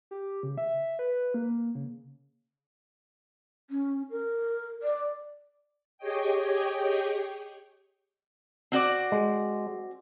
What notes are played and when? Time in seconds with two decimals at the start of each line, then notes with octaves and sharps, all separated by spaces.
0.11 G4
0.43 C#3
0.58 E5
0.99 B4
1.34 A#3
1.75 C#3
3.70 C#4
4.11 A#4
4.83 D5
5.98 G4 G#4 C#5 D#5 G5
8.72 C4 F#4 D5
9.12 G#3